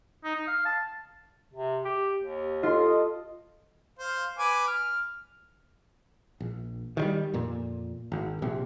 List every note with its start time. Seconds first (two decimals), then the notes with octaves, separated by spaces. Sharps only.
0.24 D#4
0.35 D#4
0.47 F5
0.65 A5
1.54 C3
1.85 G4
2.21 D#2
2.63 F4 A4 D#5 C6
3.99 C5 F5
4.38 B4 G#5 D6
4.68 F6
6.40 A#1
6.97 D#3 F#3 G3
7.34 F2 A#2
8.12 G#1
8.42 A#1 C3